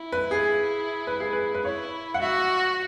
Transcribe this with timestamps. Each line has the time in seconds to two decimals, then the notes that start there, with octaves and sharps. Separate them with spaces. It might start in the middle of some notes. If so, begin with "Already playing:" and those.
Already playing: E4
0.12 B4
0.31 G#4
1.07 B4
1.20 G#4
1.33 B4
1.54 B4
1.65 E4 C#5
2.14 F#5
2.22 F#4 E5